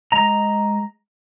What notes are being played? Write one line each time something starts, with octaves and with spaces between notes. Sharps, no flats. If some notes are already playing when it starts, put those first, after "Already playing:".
G#3 D#5 A#5